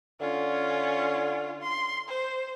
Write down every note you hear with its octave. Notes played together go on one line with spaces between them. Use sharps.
D3 C#4 F4
C6
C5